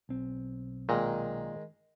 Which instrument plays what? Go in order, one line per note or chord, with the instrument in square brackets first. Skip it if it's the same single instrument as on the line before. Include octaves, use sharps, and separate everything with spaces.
[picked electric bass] B1 C4
[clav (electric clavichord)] A#2 [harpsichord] D#3 G#3